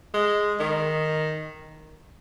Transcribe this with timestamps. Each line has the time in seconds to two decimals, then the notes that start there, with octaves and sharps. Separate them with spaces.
0.14 G#3
0.60 D#3